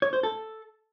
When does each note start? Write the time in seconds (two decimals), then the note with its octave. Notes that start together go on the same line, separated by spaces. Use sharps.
0.02 C#5
0.13 C5
0.23 A4